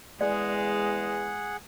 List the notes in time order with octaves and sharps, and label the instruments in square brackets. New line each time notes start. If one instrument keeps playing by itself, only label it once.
[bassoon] E2 [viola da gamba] G#3 [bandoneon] G#4 F#5 [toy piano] D5